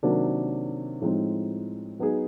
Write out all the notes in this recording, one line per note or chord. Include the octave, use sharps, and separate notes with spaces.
C3 D#3 F#3 A#3 D4
A2 F3 G#3 C4 D#4
F#3 B3 D#4 G#4